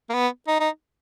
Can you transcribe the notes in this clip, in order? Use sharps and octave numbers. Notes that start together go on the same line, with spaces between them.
A#3
B3
D#4
D#4